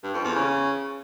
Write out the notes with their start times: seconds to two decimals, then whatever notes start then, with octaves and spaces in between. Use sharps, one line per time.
0.03 G2
0.14 F2
0.25 E2
0.35 C#3